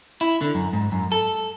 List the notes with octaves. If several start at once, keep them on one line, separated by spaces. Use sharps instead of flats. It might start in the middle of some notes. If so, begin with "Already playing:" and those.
E4
D3
F#2
G#2
F#2
A4